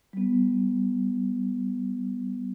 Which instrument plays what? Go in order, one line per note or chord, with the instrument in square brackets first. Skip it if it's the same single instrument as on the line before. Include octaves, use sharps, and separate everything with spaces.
[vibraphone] G3 B3